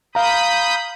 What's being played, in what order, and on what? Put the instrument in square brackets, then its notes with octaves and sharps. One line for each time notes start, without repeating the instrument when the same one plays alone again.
[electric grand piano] F5 A#5 [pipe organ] B5 D#6 G6